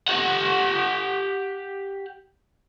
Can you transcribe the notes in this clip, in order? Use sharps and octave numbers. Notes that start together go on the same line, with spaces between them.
G4 F#5